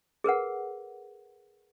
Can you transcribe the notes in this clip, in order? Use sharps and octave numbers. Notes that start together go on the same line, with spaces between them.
G#4 A#4 B4 F#5